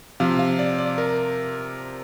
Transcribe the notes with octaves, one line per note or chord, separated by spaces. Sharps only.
C3 F3 F5
F5
D5
D5
A#4